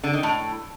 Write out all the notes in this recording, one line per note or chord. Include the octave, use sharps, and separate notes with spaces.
D3
D#3
A2